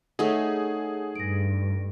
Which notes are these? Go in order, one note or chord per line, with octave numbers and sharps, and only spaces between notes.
A3 D#4 G#4 C#5 F#5
G2 A#6 D7